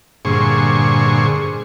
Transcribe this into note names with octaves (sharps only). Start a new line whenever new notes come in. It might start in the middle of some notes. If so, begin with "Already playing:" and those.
G2 A#2 D3 G#4 C5 C#6